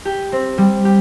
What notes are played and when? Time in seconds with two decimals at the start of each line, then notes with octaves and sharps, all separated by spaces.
0.05 G4
0.32 C4
0.58 G3
0.85 G4